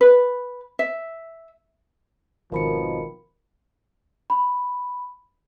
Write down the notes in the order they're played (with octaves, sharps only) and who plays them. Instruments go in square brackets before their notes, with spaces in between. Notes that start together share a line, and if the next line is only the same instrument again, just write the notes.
[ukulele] B4
E5
[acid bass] G#1 [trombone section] B2 D#3 F3 [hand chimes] A#4 B5 C#7
[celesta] B5